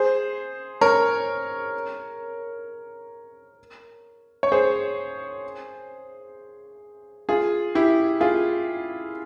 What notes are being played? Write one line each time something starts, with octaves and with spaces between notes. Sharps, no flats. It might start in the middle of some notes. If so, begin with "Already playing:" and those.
Already playing: G#4 C5
A#4 C#5
C#5
G#4 C5
F4 G#4
E4 G4
F4 G#4